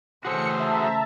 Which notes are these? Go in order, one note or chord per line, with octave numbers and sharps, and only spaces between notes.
C#3 E3 A3 F#4 G#4 A4 C5 C#7
E5 A5 A#5